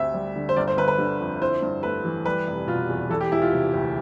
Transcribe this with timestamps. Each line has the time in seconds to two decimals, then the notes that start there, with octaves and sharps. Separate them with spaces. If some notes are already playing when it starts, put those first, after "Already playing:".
Already playing: D2 C4 E5
0.14 G3
0.36 D3
0.49 C5
0.56 G1 D5
0.68 C5
0.77 G1 B4
0.88 B4
0.98 D3
1.20 F2
1.41 E4 C5
1.62 G2
1.83 A3 B4
2.05 E3
2.26 G3 B4
2.47 F1
2.67 B2 F4
2.90 E2
3.10 E3 A4
3.21 G4
3.32 E1 E4
3.42 F4
3.53 C3
3.74 D2